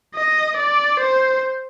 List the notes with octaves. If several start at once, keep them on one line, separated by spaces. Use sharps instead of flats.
D#5
D5
C5